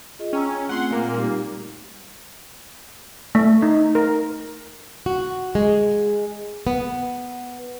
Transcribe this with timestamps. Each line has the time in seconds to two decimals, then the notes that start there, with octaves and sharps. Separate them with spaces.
0.19 F4 G#4 D#5
0.33 C#4 G5 A#5 E6
0.69 A3 C4 F4 F#5 C6
0.91 A#2 A#3
1.14 G3 D#4 G4
3.35 A3
3.62 D#4
3.95 A#4
5.06 F#4
5.55 G#3
6.67 B3